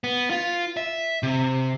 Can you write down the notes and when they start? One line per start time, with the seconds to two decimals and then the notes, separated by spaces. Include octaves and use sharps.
0.04 B3
0.30 F4
0.77 E5
1.23 C3